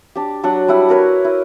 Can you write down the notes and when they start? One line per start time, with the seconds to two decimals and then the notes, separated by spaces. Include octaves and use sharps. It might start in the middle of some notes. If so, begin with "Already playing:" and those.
0.15 D4 G4
0.43 F#3 D4 F#5
0.68 G3 E4 F#5
0.89 F#4 A#4 B4 C#5
1.24 E4